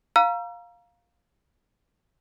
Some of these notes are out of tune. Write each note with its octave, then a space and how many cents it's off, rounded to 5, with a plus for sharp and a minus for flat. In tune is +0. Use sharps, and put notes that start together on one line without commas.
F5 +10 A#5 +15 E6 +45